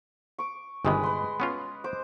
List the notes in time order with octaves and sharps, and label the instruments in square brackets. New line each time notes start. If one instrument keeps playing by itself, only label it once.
[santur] C#6 D6
[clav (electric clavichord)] G1 C3 D#3 [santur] G#3 B4
[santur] B4 C6
[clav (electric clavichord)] B3 C#4 F4
[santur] C5 D6